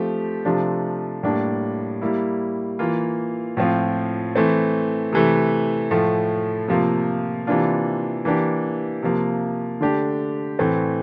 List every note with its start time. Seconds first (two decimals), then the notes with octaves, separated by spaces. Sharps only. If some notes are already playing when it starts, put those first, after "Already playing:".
Already playing: F3 A3 C4 G4
0.45 C3 F3 A3 D4
1.23 A2 G3 A#3 D4
2.02 G3 A#3 E4
2.79 E3 A#3 F4
3.57 A2 F3 C4 F4
4.35 E3 A3 C4
5.13 C3 E3 A3
5.91 A2 F3 A3
6.68 C3 F3 A#3 F4
7.47 C3 E3 A#3 D4 F4
8.25 E3 A#3 D4 G4
9.03 C3 F3 A#3
9.81 D3 A3 D4 G4
10.59 A2 E3 A3 C4